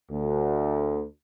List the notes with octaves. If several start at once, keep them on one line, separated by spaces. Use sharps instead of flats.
D2